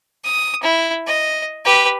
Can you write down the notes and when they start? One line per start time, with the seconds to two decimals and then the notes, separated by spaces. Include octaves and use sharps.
0.24 D#6
0.63 E4
1.07 D#5
1.65 G4 B4